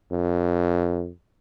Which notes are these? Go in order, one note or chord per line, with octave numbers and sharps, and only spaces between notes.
F2